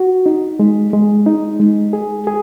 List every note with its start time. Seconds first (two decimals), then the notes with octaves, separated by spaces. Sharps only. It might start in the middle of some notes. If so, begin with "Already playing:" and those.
Already playing: F#4
0.26 D#4
0.59 G#3
0.93 G#3
1.26 D#4
1.60 G#3
1.93 G#4
2.27 G#4